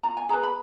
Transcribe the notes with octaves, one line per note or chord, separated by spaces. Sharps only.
F4 A#5
G#5
G#4 B4 A#5
B5